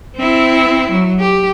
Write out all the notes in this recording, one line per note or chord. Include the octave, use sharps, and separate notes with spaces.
C4 E4
F#3
G4